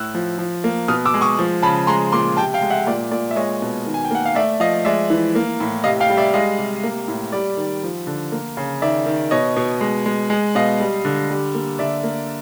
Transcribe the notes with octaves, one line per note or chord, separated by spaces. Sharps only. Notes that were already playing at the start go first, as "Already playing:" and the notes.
Already playing: A2 E6 F#6
F3
F3
A#3
B2 D#6 F6
D6 E6
G#3
C#6 D#6
F3
C#3 A5 B5
G#3 A#5 C6
A#2 C6 D6
C3 G5 A5
F5 G5
G#3
E5 F#5
A#2 D5
A#2 D5
E5
G#3 C#5 D#5
B2
D#3
G#5
G5
A#3 F#5
F5
A3 D5 E5
F3 D#5 F5
G#3 D5 E5
E3
A#3
A2
C3 D#5 F5
F5 G5
G3
D5 E5
G#3 D#5 F5
C3
A#3
A2
G3 D5
D#3
F3
D3
A#3
C#3
D#3 D5 E5
D#3
B2 C#5 D#5
B2
G#3
G#3
G#3
B2 D#5 F5
G3
D3
G3
A#3
D3 D5 E5
A#3